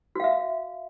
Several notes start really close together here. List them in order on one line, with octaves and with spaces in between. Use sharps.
F#4 F5 E5